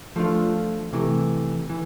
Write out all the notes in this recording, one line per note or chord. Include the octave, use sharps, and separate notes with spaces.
F3 A3 D4 F4
C3 E3 A3
E3